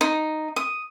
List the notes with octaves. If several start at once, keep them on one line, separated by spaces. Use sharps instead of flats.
D#4
D#6